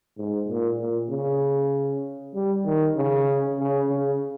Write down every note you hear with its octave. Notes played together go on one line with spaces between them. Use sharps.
G#2
A#2
A#2
C#3
G3
D#3
C#3
C#3
C#3